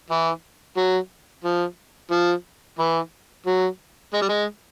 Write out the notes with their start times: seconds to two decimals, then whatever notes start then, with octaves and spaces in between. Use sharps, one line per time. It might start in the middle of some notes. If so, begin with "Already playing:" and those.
0.10 E3
0.77 F#3
1.44 F3
2.12 F3
2.79 E3
3.46 F#3
4.14 G#3
4.21 G3
4.29 G#3